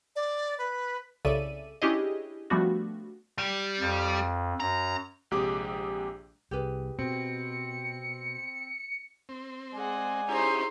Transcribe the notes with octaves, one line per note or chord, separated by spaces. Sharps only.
D5
B4
C2 C#3 A4 D5 E5 D#7
C#4 D4 E4 G4 G#4 D#5
F3 G3 A3 B3 D4 F#4
G3
F2
F#2 A#5
A#1 C3 G#3 G4 G#4 D6
C2 G4 G#4 B4
B2 C4 C#7
C4
G#3 G#4 D5 F#5 G#5
C#4 D#4 E4 G4 G#4 C5